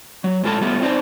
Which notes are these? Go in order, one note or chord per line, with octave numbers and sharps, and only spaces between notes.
F#3
A2 G#3 F4 A4 A5
G3 A3 B3 F4
C4 D4 D#4 C5